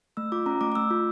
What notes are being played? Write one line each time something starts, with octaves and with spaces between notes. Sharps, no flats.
A3 E6
F4 D6
C#4 A#5
A3 D6
D6
A3 E6
F4